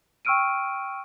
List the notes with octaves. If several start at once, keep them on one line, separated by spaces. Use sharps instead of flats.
G5 C#6 E6 F6 D7 D#7